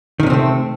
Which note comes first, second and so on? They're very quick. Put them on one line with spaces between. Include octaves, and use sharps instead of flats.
D#3 C3 C#4 C4 A3